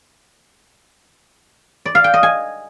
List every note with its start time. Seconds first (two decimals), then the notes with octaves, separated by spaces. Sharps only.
1.86 D5
1.95 F5
2.04 G5
2.14 D#5
2.23 G#5